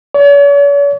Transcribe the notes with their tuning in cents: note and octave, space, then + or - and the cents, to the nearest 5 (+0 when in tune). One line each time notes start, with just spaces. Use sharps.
C#5 +45